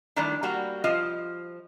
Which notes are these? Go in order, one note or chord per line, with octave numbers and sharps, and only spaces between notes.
D#3 E3 G3 A3 D4
G3 A#3 F#4
F3 F4 D#5